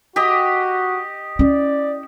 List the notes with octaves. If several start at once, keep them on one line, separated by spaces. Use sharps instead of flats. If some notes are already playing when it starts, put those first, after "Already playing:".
F#4 G4 D#5
C#4 E4 D5